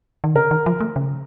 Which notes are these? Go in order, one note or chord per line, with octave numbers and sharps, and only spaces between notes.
D#3
C#3 A#4
D#3
F3
A3
C#3